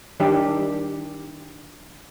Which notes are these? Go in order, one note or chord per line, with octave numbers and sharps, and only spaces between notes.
D#3 G3 D4 G4